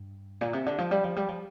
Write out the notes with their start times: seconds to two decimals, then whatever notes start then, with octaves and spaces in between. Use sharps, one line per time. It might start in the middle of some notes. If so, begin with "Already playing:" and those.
Already playing: G2
0.41 A#2
0.53 C3
0.66 D3
0.78 F3
0.91 G3
1.04 F3
1.16 G3
1.29 F3